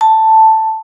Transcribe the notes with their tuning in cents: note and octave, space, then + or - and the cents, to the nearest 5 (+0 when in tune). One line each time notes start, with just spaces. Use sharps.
A5 +5